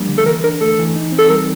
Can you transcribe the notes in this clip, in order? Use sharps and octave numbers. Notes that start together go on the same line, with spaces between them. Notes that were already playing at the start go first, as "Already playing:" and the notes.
Already playing: F3 G3 A#3 D4
D3
A4
E3 A#4
D4 A#4
A3 A4
E3
D#4
C4
A4
G3 A#4